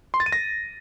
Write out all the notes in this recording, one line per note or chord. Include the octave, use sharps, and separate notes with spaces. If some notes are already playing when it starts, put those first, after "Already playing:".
C6
A6
D#7
A#6